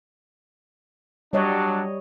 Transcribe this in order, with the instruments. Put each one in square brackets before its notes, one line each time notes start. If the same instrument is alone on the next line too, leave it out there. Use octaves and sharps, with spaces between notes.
[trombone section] F#3 D4 [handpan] G3 C#5 D#5